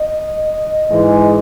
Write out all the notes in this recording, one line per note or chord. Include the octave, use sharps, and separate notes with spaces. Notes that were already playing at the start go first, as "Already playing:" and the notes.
Already playing: D#5
G#2 E3 G#3